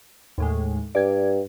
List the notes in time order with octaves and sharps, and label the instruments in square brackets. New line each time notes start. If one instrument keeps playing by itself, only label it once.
[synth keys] D#2 A2 G#3
[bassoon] G2 [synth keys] D5 G#6